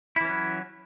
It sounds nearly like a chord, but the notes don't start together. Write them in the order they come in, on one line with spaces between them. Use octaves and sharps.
E4 E3 C#4 F#3